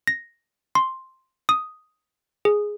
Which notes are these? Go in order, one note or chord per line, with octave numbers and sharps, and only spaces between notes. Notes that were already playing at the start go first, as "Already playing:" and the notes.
A#6
C6
D#6
G#4